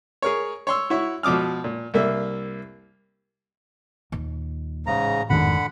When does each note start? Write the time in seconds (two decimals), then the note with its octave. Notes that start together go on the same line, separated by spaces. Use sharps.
0.22 G#4 A#4 C#5
0.67 C#5 C6 E6
0.90 E4 F#4 C#5 E5
1.23 B2 F3 D6 D#6 F6
1.64 A#2
1.94 C2 A#3 E5
4.12 D#2 A#2
4.87 A1 G#2 C#3 A#5
5.30 G#1 F2 D3 D#3 F#5 B5